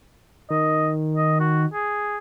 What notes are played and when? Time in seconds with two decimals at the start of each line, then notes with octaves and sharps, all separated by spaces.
0.50 D#3 D#5
1.17 D#5
1.40 F#4
1.73 G#4